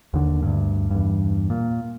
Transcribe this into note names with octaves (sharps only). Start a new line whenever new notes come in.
D#2 D3
D2 G2
E2 G2
A#2